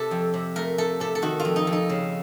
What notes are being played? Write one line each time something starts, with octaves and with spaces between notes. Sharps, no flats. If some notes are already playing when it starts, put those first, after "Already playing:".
Already playing: C3 A4
F2
C3
A3 A#4
A3 A4
C3 A4
A4
D#3 F#4
F4
F2
D#4
F2
D#4
C#3